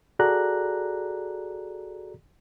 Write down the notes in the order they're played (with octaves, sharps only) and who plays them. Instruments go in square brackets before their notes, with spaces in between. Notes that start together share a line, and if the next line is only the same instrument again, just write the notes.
[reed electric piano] F#4 G#4 A4 D5 A#5 F#6